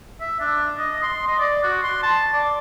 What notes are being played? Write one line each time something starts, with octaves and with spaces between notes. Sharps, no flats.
E5
D4
D#5
C6
D#5
D5
F#4
C6
A5
D5